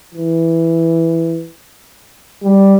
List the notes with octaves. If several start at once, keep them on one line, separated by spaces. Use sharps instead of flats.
E3
G3